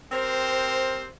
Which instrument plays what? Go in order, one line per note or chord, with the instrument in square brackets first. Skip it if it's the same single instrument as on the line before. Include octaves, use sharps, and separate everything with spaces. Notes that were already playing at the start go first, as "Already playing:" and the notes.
[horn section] C4 G4 A#4 C5